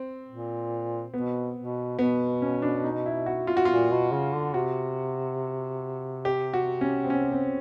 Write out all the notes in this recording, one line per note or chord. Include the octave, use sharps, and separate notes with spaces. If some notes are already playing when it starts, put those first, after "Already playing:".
Already playing: C4
A#2
B2 B3
B2
B2 B3
C#4
D4
D#4
E4
F#4
F4
F#4
A#2 F4
B2
C#3
D3
C3 F#4
G4
F#4
C#4
C4
C#4
C4